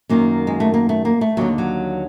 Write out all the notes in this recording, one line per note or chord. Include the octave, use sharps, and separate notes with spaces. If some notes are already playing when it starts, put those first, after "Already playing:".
F#2 D#3 A#3
G#3
A3
A#3
A3
A#3
A3
D#2 D3 F#3
F#3